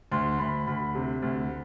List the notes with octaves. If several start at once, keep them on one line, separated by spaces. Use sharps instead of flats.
D2 C6
D2 B5
D2 B5
C3
D2